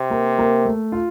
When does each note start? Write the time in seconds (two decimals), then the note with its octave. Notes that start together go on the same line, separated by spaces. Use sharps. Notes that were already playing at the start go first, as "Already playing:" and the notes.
Already playing: C3
0.10 A#3
0.38 A#3
0.65 A3
0.92 F4